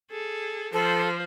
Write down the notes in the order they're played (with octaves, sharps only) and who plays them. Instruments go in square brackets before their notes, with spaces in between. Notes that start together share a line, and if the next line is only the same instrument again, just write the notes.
[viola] G#4 A4
[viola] F3 C5 [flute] A4